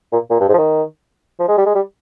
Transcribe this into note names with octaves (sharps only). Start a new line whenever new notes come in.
A#2
A#2
G2
G#2
F3
D#3
F3
G#3
G3
G#3
G3